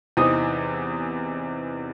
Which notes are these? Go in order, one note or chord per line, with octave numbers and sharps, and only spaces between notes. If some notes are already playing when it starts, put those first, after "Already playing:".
E2 C3 E3 C4 D#4 D#6